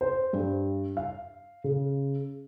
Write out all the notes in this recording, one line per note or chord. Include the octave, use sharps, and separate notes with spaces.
C5
G2
F5
C#3